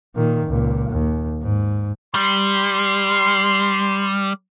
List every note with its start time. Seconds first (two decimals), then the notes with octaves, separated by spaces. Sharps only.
0.15 A#2 D#3
0.47 C#2 A#2
0.90 D#2
1.43 G#2
2.15 G3 C6